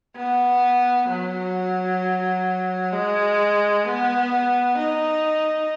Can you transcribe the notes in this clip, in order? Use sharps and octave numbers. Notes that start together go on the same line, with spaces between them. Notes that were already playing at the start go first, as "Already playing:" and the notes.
B3
F#3
G#3
B3
D#4